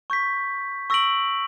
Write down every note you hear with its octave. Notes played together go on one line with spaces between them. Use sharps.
C#6 G6 B6
C#6 E6 A#6 D7 F#7